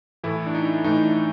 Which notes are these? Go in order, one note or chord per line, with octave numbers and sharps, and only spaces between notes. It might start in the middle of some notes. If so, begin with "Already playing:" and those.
A2 E3 A3 E4
D4
D#4
A2 E3 A3 D#4
D4